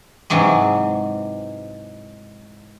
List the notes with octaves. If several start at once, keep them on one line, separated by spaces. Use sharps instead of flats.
G#2 C3 E3 F#3 G#3